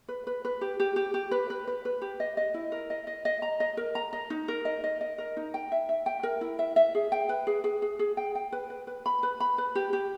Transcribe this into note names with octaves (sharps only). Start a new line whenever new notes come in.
B4
B4
B4
G4
G4
G4
G4
B4
B4
B4
B4
G4
D#5
D#5
E4
A#4
D#5
D#5
D#5
A#5
D#5
A#4
A#5
D#5
D#4
A#4
D#5
D#5
D#5
A#4
D#4
G5
E5
E5
G5
A#4
E4
E5
E5
G#4
G5
B4
G#4
G#4
G#4
G#4
G5
G5
B4
B4
B4
B5
B4
B5
B4
G4
G4